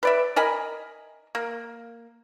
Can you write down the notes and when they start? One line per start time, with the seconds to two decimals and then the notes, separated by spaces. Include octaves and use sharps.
0.03 B4 D5 E5
0.36 A#4 D#5 G#5 B5
1.35 A#3